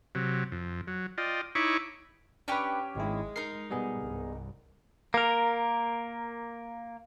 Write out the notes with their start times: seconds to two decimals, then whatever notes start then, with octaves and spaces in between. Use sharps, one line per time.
0.15 C3 F#3
0.52 F2
0.87 F#3
1.18 F4 D5 D#5 G5
1.55 D#4 E4 C#5 B5 C#6 D6
2.48 C#4 D4 G4 B4 C#5
2.96 G#1 G#2 G#3 E4
3.36 D#4 A#4 C7
3.71 B2 G3 B3 G#4
4.00 C2 G2
5.14 A#3 A#4